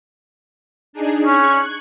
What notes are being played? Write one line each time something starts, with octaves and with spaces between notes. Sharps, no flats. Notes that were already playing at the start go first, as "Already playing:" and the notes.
D4 D#4 G#4
C#4 C#6 F#6 G#6